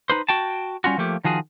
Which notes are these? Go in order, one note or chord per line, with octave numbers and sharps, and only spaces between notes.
D#4 B4 C5
F#4 G5 A5
G3 C#4 F4 F#4
F3 A3 A#3 G4
D#3 F3 F#4 G#4